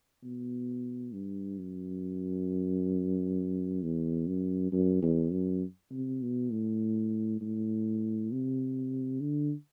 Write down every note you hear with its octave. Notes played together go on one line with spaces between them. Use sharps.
B2
G2
F#2
E2
F#2
F#2
E2
F#2
C3
B2
A2
A2
C3
D3